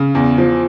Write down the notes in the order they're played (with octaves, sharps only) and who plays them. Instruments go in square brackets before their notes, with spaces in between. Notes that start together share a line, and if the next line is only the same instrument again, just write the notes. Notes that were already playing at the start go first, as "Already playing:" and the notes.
Already playing: [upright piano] C#3
E2
F3